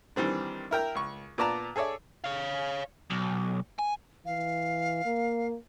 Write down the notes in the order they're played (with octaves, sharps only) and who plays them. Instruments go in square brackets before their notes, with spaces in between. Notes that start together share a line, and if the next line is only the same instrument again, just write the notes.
[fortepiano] D#3 E3 G3 C4 D4
E4 A#4 G5 A#5
C#2 C#6
A#2 B3 D5 A5 A#5
G#4 A4 C#5 D5 E5
[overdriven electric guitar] C#5 F5
B1
G#5
[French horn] E3 [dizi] F5
[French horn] A#3